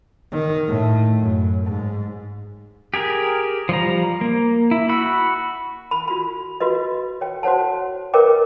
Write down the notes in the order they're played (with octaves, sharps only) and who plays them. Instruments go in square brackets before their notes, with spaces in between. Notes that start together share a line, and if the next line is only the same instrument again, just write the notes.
[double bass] D#3
A2
F#2
G#2
[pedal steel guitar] G4 G#4 A#4
F3 G3 A#5
A#3
E4
F#4 B5 E6
[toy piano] B5
F4 F#4 B5
F4 F#4 B4 D#5
C#5 G5
F#4 C5 C#5 F#5 A5
A#4 B4 C#5 D#5 G5 D6